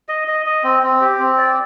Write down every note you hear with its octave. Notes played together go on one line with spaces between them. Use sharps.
D#5
D#5
D#5
C4
C4
G4
C4
D5